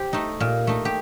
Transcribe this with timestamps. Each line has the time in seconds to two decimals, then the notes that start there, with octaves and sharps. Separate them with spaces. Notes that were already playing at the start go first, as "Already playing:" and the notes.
Already playing: G4 C5
0.13 A3 D#4
0.40 A#2
0.67 A3 D#4
0.85 G4